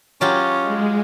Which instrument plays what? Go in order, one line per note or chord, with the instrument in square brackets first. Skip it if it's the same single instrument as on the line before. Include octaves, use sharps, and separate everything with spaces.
[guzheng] F#3 F4 G4 [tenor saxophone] C#4
[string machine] G#3